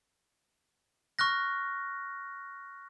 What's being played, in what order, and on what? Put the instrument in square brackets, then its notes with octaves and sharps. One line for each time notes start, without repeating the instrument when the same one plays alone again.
[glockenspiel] C#6 F6 F#6 A#6